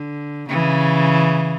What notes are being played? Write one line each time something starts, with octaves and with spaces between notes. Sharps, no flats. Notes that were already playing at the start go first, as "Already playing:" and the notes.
Already playing: D3
C#3 E3